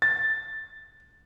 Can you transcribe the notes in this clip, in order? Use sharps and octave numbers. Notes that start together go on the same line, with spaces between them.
A6